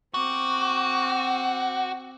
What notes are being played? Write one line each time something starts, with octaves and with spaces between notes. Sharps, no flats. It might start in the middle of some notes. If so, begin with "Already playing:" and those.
C4 F#4 D6